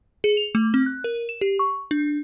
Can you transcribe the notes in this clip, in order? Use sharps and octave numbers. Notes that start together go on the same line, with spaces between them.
G#4
F7
A3
C4
F#6
A#4
E7
G4
C#6
D4